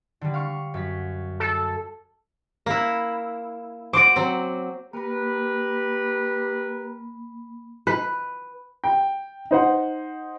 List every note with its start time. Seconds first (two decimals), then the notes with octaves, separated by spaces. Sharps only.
0.21 D3 G3
0.34 F5 C#6
0.74 F#2 B6
1.40 A4
2.66 A#3 E4
3.93 F#4 C5 D6 D7
4.16 F#3 C4
4.93 A#3 G4 A#4 B4 B5
7.87 B4
8.84 G5
9.51 D#4 C5 F#5